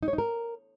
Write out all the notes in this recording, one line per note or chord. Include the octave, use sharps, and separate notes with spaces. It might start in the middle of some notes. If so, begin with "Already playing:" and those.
D#4
C#5
D#4
A#4